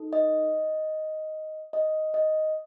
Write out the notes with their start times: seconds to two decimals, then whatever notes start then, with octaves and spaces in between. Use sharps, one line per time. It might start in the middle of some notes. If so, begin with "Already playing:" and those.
Already playing: D#4 A4
0.13 D#5
1.73 D#5
2.14 D#5